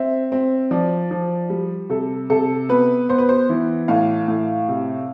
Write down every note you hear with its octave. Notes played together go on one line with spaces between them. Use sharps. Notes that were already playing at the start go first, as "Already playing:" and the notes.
Already playing: C4 E5
C4
F3 D5
F3
G3
C3 A4
C3 A4
B3 B4
B3 C5
B4
C5
E3
A2 F5
A2
C3